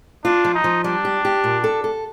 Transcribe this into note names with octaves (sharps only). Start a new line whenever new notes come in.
D4 F4
F3
D#4
F3
G3 D4
G4
G4
A#2
A4
A4